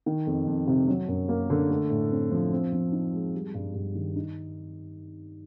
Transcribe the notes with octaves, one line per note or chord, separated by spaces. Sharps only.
D#3
F2
F2
C3
F#3
F#2
A#3
D3
A3
A2
C4
F3
C4
F3
D#4
G#3
G3
G2
G2
D#3
D#4